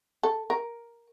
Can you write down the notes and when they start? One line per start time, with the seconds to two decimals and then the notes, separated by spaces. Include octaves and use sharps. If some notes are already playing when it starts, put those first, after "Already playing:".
0.23 A4
0.50 A#4